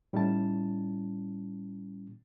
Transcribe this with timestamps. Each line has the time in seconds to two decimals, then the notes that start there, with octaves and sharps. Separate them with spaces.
0.13 A2 G3 C#4 D#4 E4 A5